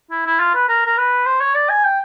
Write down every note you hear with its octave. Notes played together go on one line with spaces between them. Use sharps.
E4
E4
F4
B4
A#4
A#4
B4
C5
C#5
D5
G#5
G5